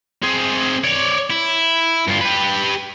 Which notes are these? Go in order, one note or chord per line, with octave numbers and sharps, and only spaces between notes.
C4 G#4
C#5 D5
E4
G2 F4
G4 B4